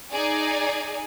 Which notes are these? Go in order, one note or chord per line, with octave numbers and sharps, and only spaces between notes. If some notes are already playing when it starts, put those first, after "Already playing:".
D#4 G#4 D5 G#5